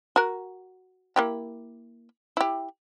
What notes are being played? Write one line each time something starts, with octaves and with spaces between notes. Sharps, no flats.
F#4 A#4
A#3 E4 G4
E4 G4